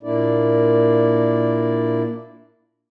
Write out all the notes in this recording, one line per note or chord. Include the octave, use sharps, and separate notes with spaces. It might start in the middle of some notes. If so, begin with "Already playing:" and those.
A#2 A#3 D4 E4 D5